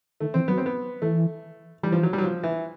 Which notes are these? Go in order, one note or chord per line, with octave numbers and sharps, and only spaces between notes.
D#3 A3
E3 C4
F#3 B3
C4
B3
E3 A3
E3 G3
F3
F#3
G3
F#3
F3
E3